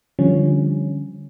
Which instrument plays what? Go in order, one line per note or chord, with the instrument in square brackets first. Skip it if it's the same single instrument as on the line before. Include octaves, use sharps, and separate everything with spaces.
[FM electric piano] D3 F3 G3 C#4